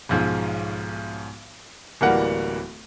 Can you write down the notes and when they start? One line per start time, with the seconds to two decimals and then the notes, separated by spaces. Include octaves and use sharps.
0.09 B1 G#2 F3
2.01 D1 E3 G3 A#3 F#5